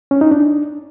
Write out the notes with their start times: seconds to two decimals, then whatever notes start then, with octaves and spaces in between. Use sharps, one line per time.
0.11 C#4
0.21 D#4
0.31 D4